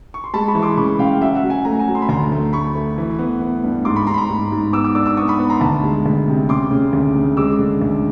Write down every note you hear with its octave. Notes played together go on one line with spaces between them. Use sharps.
C#6
C6
G#3 A5 B5
B5 C#6
E3
C6 D6
C#3 B5 C#6
C#3 F5 G5
F#3 E5 F#5
E5 F#5
F#3
F#5 G#5
A3 G#5 A#5
G#5 A#5
F#3
C6
B5
D2 A#5 C6
A3
A3 B5 C#6
A3
E3
B3
B3
G2
G#2 C6 D6
B5 C#6
G#2 A#5 C6
B5
A#5 C6
G#2
G#2
B3 D6 E6
D6 E6
D4 D6 E6
D6 E6
B3 C#6 D#6
B5 C#6
B3
A#5 C6
D2 A5 B5
G#3
D2
C3
C#3 C6 D6
C#3
D2
C#3
G#3 D6 E6
D3
D2